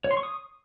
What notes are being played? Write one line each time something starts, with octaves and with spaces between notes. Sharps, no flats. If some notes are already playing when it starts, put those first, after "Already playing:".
C#5
C6
C#6
D#6